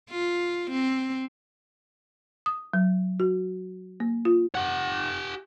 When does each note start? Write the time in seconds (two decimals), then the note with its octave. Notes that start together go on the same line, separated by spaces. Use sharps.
0.11 F4
0.71 C4
2.46 D#6
2.73 F#3
3.20 F#4
4.00 A#3
4.25 F4
4.55 G4 F#5